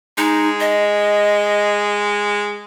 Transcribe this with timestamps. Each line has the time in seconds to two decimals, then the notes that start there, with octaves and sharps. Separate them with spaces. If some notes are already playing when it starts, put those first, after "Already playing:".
0.18 G#3 D#4
0.60 D#5